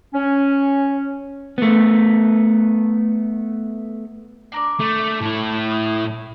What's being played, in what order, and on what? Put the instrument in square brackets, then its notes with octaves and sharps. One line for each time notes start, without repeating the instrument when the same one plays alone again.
[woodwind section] C#4
[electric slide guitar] A3 B3
[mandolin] D4 A#4 D5
[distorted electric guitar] A3
[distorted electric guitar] A2 E4 [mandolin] A5 B5 C#6
[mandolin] D#6